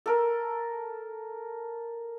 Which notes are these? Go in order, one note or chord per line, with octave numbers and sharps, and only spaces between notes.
A4 A#4